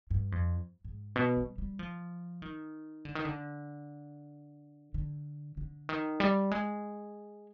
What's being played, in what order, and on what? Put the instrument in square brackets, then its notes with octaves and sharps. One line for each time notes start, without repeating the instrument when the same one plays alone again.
[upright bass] G2
F2
G#2
B2
G3
G3
F3
D#3
D3
D#3
D3
D3
D3
D#3
G3
G#3